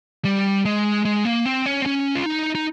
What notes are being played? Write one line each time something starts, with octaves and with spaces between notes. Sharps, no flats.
G3
G#3
G#3
A#3
C4
C#4
C4
C#4
F4
D#4
D#4